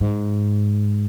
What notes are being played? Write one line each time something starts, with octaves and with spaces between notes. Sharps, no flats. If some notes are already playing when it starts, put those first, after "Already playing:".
G#2